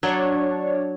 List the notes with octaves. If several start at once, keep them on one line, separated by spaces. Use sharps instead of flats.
F#3 D4 C#5